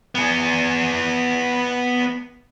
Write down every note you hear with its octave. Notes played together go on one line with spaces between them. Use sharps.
B3 G#4